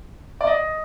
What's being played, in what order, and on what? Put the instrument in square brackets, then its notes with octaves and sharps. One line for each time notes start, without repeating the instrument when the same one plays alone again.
[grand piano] D5
D#5